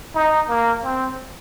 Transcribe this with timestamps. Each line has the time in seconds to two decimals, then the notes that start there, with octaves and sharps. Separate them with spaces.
0.15 D#4
0.49 A#3
0.84 C4